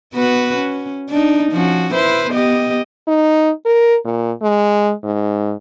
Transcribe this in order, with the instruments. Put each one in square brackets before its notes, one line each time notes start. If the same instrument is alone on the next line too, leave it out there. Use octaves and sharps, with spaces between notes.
[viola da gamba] B3 F#4 B4
C#4
D4 D#4
F3 C#4 F#4
E4 B4 C5
B3 G4 D#5
[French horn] D#4
A#4
A#2
G#3
G#2